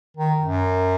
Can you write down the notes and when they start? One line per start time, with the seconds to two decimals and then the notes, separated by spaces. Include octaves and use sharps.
0.17 D#3
0.41 F#2